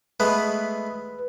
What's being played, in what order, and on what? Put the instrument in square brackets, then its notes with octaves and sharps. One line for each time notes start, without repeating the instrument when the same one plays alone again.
[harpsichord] G#3 A3 B3 [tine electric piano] B4